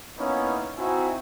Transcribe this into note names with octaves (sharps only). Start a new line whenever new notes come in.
A#3 B3 C#4 D#4 E4
C4 D#4 E4 F#4 G#5